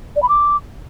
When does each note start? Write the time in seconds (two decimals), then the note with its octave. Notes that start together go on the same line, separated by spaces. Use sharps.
0.16 D5
0.22 B5
0.29 D6